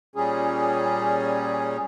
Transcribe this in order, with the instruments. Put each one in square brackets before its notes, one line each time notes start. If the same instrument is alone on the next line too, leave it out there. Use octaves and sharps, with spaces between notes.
[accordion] A#2 G3 C#4 G#4